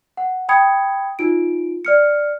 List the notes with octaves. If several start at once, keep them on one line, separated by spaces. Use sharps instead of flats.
F#5
G5 B5 D#6 G#6 C#7
D#4 F4 D7
D5 F6 C#7